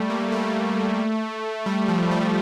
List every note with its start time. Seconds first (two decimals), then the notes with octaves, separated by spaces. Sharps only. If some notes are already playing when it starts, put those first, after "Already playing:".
Already playing: G3 A3
0.10 A#3
0.32 A3
1.66 G3
1.88 F3
2.11 G3